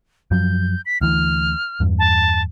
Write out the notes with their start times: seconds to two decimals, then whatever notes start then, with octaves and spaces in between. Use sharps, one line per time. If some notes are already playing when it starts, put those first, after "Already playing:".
0.31 F#2 F3 F#3 G6
0.86 B6
1.01 D2 E3 F6
1.80 E2 G2
1.99 A5